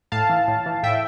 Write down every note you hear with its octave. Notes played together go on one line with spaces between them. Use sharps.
A2 F5 A5
E3
A2
E3
A2 E5 G5